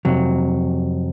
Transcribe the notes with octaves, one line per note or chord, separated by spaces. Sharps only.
F2 C3 F#3